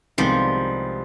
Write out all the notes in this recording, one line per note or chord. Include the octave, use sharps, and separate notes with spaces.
C2 C3 D#3 F3 G3 G#3 B3